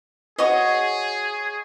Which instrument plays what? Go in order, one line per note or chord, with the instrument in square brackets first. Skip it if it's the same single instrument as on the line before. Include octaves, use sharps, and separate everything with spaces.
[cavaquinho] F#4 C#5 D#5 [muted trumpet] G#4